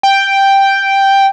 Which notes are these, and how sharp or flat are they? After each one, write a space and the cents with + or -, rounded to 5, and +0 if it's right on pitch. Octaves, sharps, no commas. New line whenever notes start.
G5 +0